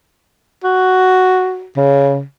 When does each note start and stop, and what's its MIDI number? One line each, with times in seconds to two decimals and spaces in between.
0.64 1.68 66
1.77 2.22 49